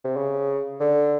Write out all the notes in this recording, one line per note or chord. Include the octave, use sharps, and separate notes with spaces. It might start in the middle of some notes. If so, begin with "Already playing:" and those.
C3
C#3
D3